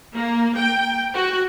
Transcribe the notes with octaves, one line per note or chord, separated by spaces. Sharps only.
A#3
G5
F#4